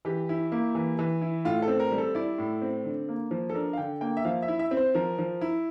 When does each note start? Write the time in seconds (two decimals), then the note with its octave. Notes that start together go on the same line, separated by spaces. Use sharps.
0.05 E3 G4
0.29 E4
0.52 A#3
0.75 E3
0.99 E3
1.21 E4
1.45 A2 F4
1.62 A4
1.68 C4
1.80 A#4
1.91 G3
1.98 A4
2.15 E4 D5
2.38 A2
2.62 C4
2.85 D3
3.09 A#3
3.31 F3
3.50 A4
3.54 D4 A#4
3.73 F5
3.78 D3 G5
4.01 A#3 G5
4.17 E5
4.25 F3 F5
4.42 E5
4.48 E4
4.59 E5
4.71 C4
4.77 C5
4.95 F3 A#4
5.18 F3
5.41 E4